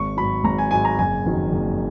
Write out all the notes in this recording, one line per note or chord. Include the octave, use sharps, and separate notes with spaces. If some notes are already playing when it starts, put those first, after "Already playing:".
Already playing: G#1 C#6
G#2 F#3 B5
G#1 A#5
G#5
G#2 F#3 G#5
A#5
F#1 G#5
F2 D#3 F#3
F#1